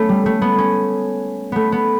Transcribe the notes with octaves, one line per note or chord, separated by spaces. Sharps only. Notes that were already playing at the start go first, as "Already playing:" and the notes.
Already playing: A3 B3 C#4
G3
A3
B3
C#4
A3 B3
B3